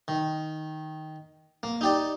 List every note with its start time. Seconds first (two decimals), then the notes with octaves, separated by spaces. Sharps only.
0.08 D#3
1.63 A#3
1.81 D#4 G4 D5